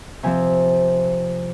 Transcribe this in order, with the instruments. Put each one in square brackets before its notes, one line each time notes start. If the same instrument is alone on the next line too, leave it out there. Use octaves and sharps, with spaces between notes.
[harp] C3 F3 C4 G#5